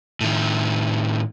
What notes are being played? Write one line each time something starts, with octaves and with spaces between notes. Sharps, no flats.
A2 D#3